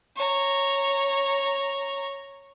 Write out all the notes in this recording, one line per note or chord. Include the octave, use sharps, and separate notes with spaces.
C#5 A#5